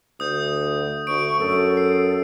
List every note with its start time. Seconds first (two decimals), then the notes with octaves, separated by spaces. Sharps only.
0.20 D2 D#6 G6
1.07 D2 C#6 D7
1.40 F#2 A4
1.77 C7